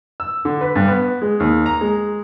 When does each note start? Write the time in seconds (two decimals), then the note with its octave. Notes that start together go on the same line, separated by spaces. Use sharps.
0.20 E6
0.45 D3
0.61 B4
0.76 G2
0.88 B3
1.22 G#3
1.40 D#2
1.66 A#5
1.81 G#3